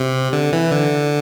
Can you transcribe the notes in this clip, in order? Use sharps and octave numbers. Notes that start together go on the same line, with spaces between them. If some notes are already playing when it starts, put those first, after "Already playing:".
Already playing: C3
D3
E3
D3